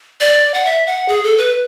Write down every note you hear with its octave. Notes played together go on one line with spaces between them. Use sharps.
D5
F#5
E5
F#5
G#4
A4
B4